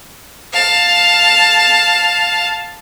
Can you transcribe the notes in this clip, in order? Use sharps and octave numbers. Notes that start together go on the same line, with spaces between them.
F5 A5